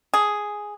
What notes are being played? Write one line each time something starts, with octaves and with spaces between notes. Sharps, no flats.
G#4